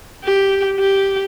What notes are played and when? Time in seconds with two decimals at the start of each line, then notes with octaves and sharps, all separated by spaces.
0.24 G4
0.79 G4